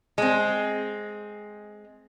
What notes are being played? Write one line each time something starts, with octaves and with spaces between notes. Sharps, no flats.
G#3 C4